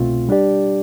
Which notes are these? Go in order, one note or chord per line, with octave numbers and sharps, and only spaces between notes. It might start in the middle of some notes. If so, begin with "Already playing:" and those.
Already playing: C2 B2 A3 C4 F4
G3 D4 G4 D5